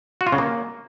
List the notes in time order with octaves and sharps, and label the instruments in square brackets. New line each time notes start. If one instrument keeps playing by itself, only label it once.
[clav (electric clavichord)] F#4
F4
C#3
A#3